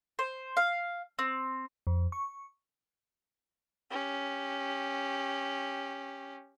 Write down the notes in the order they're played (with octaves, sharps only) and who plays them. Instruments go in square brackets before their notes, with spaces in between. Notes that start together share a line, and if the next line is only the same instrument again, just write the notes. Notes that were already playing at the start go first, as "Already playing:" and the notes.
[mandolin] C5
F5
C4
[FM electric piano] F2
C#6
[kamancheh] C#4 G4